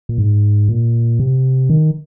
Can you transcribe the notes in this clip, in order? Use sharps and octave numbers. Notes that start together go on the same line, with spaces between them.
A#2
G#2
A#2
C3
D#3